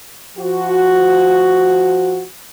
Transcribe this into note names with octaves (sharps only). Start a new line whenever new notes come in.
F3 F#4